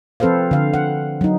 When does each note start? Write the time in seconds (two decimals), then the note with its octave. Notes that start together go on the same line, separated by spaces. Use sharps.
0.20 F3 C4 A4 B4 C5 F5
0.51 D3 F5
0.74 F#5
1.21 F#3 D#4